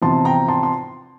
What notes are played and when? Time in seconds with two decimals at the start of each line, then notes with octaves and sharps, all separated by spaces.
0.02 E2 C3 F3 A5 C6
0.25 G5 A#5
0.48 A5 C6
0.63 C6